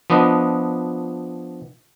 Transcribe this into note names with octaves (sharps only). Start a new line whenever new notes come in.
F3 B3 D4 B4 D#5